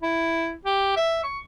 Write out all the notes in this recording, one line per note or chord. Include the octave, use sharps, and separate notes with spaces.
E4
G4
E5
C#6